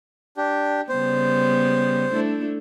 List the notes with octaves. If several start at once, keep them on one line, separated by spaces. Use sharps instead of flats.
D4 G4
C#3 G3 B3 C5
A3 D4 E4